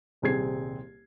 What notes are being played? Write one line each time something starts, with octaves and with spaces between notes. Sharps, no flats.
D#1 C2 C4 G#4 G#6 C7